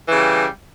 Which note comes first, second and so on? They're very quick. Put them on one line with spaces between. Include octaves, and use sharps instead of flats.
E3 C#3 G3